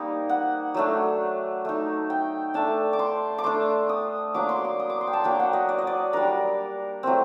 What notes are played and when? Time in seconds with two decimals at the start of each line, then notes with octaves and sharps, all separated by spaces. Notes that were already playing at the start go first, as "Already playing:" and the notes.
Already playing: G3 A#3 D#4 D#5
0.29 F#5
0.74 F#3 A3 D4
1.65 A3 D#4
2.10 G5
2.54 A3 D4 A5
2.93 D6
2.99 C6
3.38 D6
3.44 A3 D4 C6
3.89 D#6
4.34 F#3 A#3 D4 D6
4.49 C6
4.64 D6
4.79 D#6
4.90 D6
5.01 C6
5.07 G5
5.13 A5
5.24 F#3 A#3 D4 G5
5.39 F#5
5.53 D#5
5.69 D5
5.78 D#5
5.87 D5
6.13 G3 D4 A#4
7.03 F#3 A3 C4